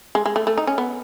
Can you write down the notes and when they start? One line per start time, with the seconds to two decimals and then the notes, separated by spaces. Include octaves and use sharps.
0.15 G#3
0.26 G#3
0.36 A3
0.47 A3
0.58 D#4
0.67 C#4
0.78 B3